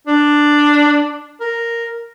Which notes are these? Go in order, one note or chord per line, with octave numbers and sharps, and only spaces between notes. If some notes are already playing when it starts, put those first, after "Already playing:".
D4
A#4